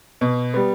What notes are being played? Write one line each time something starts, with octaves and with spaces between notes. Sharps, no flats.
B2
G3 B3